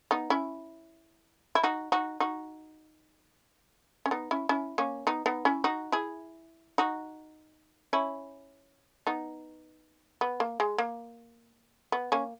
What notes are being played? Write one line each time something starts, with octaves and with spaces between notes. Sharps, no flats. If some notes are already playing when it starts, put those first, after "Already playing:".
B3 D#4
C#4 E4
E4
D#4 F#4
D#4 F#4
D#4 F#4
C#4
B3 D#4
C#4 E4
C#4 E4
A#3 C#4
B3 D#4
B3 D#4
C#4 E4
D#4 F#4
E4 G#4
D#4 F#4
C#4 E4
B3 D#4
B3
A#3
G#3
A#3
B3
A#3 C#4